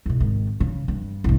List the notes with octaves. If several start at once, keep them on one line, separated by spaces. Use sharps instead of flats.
E2 B2
G#1 D#3
C#3
G2
C2 G2